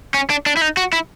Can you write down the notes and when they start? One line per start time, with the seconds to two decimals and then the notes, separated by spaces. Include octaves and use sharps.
0.14 C#4
0.30 D4
0.46 D4
0.57 E4
0.62 D#4
0.77 F#4
0.93 E4